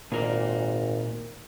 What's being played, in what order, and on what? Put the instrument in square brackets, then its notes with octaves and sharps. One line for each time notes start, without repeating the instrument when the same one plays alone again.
[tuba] G#1 [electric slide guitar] A#2 A#4 D5